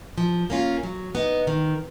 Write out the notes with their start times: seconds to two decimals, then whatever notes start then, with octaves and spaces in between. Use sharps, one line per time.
0.18 F3
0.50 A#3 C#4 F4
0.83 F#3
1.15 B3 D#4
1.47 D#3